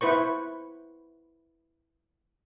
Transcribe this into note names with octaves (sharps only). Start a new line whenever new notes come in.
E4 B4 C5 C#6